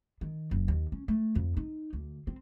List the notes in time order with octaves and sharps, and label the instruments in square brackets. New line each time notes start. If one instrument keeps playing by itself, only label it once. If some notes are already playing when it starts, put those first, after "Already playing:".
[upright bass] D#3
F#1
D#2
C#4
A3
F2
D#4
D2
C4